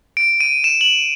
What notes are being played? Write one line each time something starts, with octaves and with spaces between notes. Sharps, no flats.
D7
D#7
E7
F#7